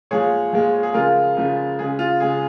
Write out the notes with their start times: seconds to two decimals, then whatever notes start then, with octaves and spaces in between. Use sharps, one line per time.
0.11 A#2 F3 G#3 G#4 C#5
0.53 A#2 F3 G#3
0.83 G#4
0.94 C#3 F3 G#3 F4 A#4
1.37 C#3 F3 G#3
1.79 C#3 G#3 G#4
1.99 F4
2.20 C#3 G#3 G#4